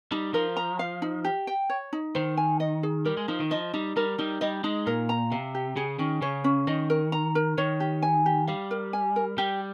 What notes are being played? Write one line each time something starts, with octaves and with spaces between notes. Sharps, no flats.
G3 D#4
F3 A#4
A#5
F5
D#4
G4
G5
C#5
D#4
D#3 C5
G#5
D#5
G#4
G3 A#4
G#3
F3 D#4
D#3
F3 D#5
G3 D#4
G3 A#4
G3 D#4
G3 D#5
G#3 D#4
A#2 A#4
A#5
C3 F5
G4
C#3 G#4
D#3 C#4
C#3 C#5
C#4
D#3 D#5
A#4
A#5
A#4
D#3 C#5
G4
G#5
G4
G3 F5
A#4
G#5
A#4
G3 G4